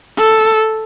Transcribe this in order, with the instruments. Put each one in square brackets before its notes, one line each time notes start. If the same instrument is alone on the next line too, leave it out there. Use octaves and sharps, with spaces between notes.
[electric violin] A4